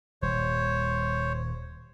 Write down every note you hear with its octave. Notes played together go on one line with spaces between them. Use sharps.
D#1 D#2 G3 C5 C#5